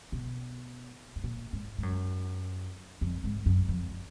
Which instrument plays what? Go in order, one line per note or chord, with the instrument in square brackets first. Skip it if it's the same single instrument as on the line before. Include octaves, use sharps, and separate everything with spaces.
[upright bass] B2
G#2
A#2
G#2
G#2
F#2
F2
G#2
F#2
F2